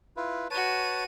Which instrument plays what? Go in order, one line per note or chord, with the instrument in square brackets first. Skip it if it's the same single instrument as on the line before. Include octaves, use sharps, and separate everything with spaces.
[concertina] E4 F4 B4
[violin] F#4 D#7 [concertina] B4 C#5 A5